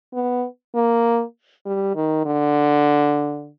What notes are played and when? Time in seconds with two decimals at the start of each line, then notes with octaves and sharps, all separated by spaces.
0.13 B3
0.75 A#3
1.66 G3
1.95 D#3
2.25 D3